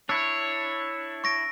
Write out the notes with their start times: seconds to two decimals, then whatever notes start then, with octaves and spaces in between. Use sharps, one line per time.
0.09 D4 E4 C#5 E6
1.24 C#6 A#6 D7